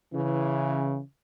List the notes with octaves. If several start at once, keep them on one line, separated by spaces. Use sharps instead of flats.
C#3 E3